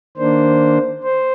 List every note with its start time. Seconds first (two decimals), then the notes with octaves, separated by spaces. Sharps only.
0.17 D#3 A#3 D4 C5
1.04 C5